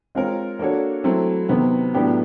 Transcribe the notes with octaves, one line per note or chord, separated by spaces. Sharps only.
G#3 C4 F4 A#4 C#5
A#3 D4 F#4 A4 C#5
F#3 A3 C4 E4
C3 D#3 F#3 B3
A2 F#3 B3 D4 G4